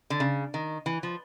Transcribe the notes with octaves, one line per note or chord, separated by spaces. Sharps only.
D3
C#3
D#3
E3
F3